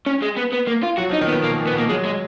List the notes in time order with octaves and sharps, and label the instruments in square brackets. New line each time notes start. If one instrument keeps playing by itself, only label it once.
[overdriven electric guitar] C#4
G#3
B3
B3
A#3
F4
[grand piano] F#3 [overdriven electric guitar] F#4
[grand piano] F3
[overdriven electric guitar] D#4
[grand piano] D#3
[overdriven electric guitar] B3
[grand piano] D#3
[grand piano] B2 [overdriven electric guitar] A#3
[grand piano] A#2
[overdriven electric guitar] B3
[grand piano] B2 [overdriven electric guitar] A#3
[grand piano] F#3 [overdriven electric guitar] G#3
[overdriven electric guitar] G#3